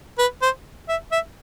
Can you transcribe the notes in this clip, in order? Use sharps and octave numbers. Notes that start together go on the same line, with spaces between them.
B4
C5
E5
E5